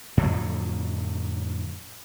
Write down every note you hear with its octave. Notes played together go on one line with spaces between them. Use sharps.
F2 A2 D3 F#3